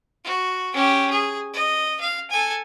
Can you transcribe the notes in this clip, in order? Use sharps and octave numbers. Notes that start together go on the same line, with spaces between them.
F#4
C#4 G4
G#4
D#5
F5
A4 G#5